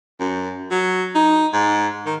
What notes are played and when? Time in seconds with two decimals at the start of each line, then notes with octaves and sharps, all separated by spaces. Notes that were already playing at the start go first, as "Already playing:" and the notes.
0.20 F#2
0.71 F#3
1.15 D#4
1.53 G#2
2.06 D#3